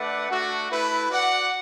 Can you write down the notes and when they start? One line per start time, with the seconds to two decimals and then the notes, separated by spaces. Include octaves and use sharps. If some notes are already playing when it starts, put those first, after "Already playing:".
Already playing: A3 D4 B4 D5 F#5
0.30 A3 D4 F#4
0.70 A3 E4 B4
1.09 F#4 D5 F#5